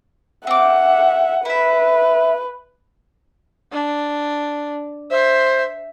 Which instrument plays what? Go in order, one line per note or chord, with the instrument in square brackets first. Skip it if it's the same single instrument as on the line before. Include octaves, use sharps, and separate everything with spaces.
[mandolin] C4 D6 [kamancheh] E5 F#5
[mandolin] E4 E5 [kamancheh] B4
[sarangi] D4
[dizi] C5 [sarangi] E5